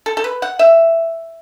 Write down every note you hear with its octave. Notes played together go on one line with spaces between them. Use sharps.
A4
A4
B4
F#5
E5